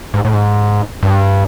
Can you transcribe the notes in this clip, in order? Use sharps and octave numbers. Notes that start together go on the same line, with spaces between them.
G#2
A2
G#2
G2